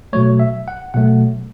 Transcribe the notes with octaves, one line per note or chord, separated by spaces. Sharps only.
B2 F#3 A3 C#5
E5
F#5
B2 F#3 A3 F#5